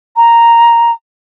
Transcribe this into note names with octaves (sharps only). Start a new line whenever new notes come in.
A#5